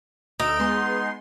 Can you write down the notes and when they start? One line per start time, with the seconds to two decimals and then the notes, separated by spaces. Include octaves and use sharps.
0.40 D2 D#4 E6 D7
0.59 G#3 B3 C6